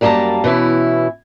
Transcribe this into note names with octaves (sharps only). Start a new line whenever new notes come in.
F#2 G3 A#3 G4 A5 A#5
B2 E3 C#4 E4